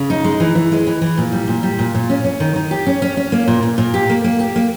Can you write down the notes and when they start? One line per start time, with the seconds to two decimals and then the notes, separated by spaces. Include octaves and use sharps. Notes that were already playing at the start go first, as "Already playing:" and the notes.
Already playing: C#3
0.10 D#4
0.24 G#3
0.40 E3
0.55 E3
0.72 G#3
0.87 E3
1.01 E3
1.18 A#2
1.32 G3
1.48 A#2
1.63 G3
1.79 A#2
1.95 A#2
2.10 C#4
2.24 C#4
2.40 D#3
2.56 D#3
2.71 G4
2.87 C#4
3.02 C#4
3.17 C#4
3.32 A#3
3.48 A#2
3.63 A#2
3.78 A#2
3.94 G4
4.09 A#3
4.24 A#3
4.40 G4
4.56 A#3